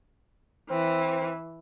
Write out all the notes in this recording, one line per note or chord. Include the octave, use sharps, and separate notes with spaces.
E3 C4